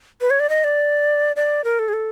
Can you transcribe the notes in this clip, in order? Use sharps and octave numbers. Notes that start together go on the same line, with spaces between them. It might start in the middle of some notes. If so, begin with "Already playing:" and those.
B4
C#5
D5
D#5
D5
D5
A#4
A4
G#4
A4